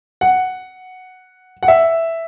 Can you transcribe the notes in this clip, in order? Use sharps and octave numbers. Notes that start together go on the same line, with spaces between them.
F#5
F#5
E5